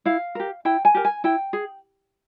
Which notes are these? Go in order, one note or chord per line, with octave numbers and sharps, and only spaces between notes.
E4 F5
G4 A#4
E4 G5
G#5
G4 A#4
G#5
E4 G5
G#4